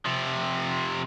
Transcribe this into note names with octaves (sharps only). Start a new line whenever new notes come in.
C3 F3